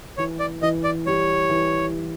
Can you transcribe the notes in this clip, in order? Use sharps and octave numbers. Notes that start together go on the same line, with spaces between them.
E3 C#5
D5
E3 D#5
D5
G3 C#5
E3